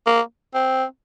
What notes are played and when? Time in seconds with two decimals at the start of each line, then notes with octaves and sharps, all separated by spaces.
0.06 A#3
0.55 C4